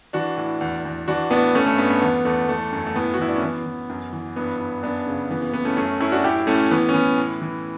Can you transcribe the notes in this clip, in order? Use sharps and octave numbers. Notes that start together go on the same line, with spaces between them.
E3 D4 F#4
A2
E2
E2
E3 D4 F#4
A2 B3 D4
G2 A3 C#4
A3
G2 B3
B3
E2 B3
E2 A3
E3 A3
F#2
A3
A2 B3
F#4
E3 E4
D4
C#4
E3 B3
E3
F#2
E3
G2 B3
G2
F#2 B3 D4
C#3
E3 B3
B3
A2 B3
A3 C#4
F#2 A3 C#4
F#2 C#4 E4
D4 F#4
A2 E4 G4
A2 A3 C#4
E3 B3
C#4
E3 B3
A2
E3